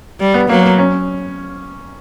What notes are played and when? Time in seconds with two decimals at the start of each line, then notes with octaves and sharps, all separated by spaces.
0.20 G3
0.34 B3
0.49 F#3 A#3
0.63 A#3
0.78 C#4